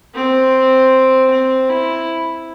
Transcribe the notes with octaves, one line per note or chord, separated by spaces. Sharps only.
C4
C4
E4